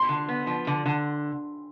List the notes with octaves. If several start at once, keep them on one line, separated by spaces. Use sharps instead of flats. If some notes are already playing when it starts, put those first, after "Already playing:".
Already playing: C6
D3
B3
F3
D3
D3